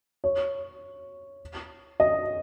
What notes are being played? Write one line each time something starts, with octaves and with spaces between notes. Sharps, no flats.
C#5
D#5